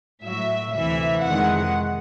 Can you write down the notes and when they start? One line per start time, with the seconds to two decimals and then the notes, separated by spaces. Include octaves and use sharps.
0.25 A2 F#3 E5
0.75 D2 C3 E3 E5
1.25 F2 C3 D#3 G#3 F#5